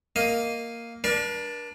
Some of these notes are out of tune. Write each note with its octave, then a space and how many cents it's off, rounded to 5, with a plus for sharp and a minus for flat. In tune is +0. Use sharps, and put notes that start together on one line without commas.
A#3 +0 D#5 +5
D4 +0 A#4 +45